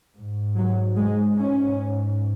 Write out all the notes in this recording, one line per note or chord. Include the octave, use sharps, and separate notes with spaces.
G#2
F#3
G#3
C#4